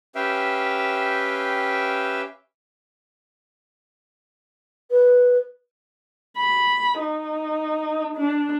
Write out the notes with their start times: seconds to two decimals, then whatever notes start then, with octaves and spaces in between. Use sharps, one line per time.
0.15 C#4 G4 B4 E5 F5 G5
4.91 B4
6.38 B5
7.00 D#4
8.16 D4